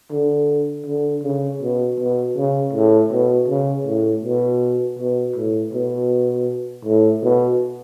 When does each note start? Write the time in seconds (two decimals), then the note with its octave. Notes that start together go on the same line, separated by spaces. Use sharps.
0.11 D3
0.86 D3
1.23 C#3
1.62 B2
1.99 B2
2.37 C#3
2.73 A2
3.11 B2
3.48 C#3
3.86 A2
4.24 B2
4.99 B2
5.36 A2
5.73 B2
6.85 A2
7.23 B2